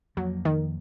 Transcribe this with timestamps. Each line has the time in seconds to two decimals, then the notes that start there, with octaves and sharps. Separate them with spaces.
0.17 F2 F3 F#3 A#3
0.45 D#3